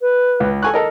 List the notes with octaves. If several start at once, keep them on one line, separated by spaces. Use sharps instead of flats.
B4
C#2
A4 G#5 C#6 F#6
A4 A#4 D#5 A5